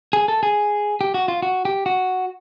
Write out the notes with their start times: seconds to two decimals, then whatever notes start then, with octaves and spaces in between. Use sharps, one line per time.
0.13 G#4
0.28 A4
0.43 G#4
1.01 G4
1.14 F#4
1.28 F4
1.42 F#4
1.65 G4
1.86 F#4